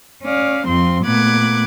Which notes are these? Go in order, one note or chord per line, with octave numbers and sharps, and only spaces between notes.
C#4 D5 F5
F2 F3 C4 C6
A#2 A3 B3 D6 F#6 G#6